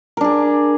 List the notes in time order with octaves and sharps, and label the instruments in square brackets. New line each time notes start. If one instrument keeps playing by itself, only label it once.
[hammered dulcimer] A#4
D4
G#4